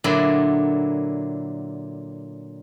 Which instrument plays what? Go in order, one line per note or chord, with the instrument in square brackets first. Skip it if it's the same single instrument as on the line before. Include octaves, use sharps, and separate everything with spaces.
[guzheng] A#2 D3 F#3 E4 D5